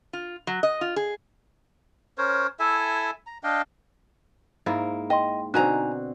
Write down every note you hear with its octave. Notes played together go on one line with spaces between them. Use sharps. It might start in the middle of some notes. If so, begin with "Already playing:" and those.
F4
F#3
D#5
F4
G#4
C#4 A#4 C5 C#5
E4 A4 E5 G#5
A#5
D4 D#5 F5 G5
G#2 A#3 E4
D#5 G5 C6
B2 D3 C4 D#4 G#5 A#5 F#6